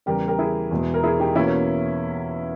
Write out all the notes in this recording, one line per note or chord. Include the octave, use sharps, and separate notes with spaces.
E2 C#3 G3 G4 A#4
G4 A#4
E4 G#4
E2 B2 G#3
A#4
E4 G#4
D#4 G4
E2 B2 A#3 C#4 E4
C#4